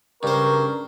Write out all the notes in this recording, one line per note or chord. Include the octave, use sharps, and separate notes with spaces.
G2 C#3 A#4 C5 C#6